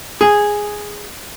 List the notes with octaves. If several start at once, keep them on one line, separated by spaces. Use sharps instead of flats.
G#4